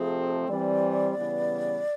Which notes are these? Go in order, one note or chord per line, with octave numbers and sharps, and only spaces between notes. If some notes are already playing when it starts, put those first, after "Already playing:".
Already playing: F2 C3 F3 A3 C4 G#4
E3 G3 C4 D5
C#3 E3 G3 B3